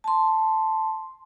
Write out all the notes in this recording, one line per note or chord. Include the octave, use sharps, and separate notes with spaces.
A5 C6